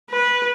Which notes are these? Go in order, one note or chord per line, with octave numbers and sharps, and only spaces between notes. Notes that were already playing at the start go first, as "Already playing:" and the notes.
B4